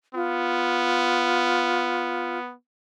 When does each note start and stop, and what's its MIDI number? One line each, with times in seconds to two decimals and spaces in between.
0.15 2.54 59
0.15 2.38 65